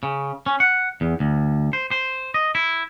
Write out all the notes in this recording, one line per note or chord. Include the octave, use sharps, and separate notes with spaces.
C#3
C#4
F#5
E2
D2
C5
C5
D#5
E4